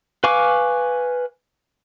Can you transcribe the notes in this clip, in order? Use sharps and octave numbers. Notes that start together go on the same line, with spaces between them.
B4 F5 G#5 C#6 D6